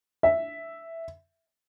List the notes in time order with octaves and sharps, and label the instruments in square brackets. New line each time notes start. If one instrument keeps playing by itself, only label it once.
[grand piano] E5